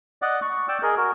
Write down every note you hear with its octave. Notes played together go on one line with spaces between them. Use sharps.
D5 D#5 F#5
C#6
D5 G5 E6
G#4 A#4 D#5
F#4 A#4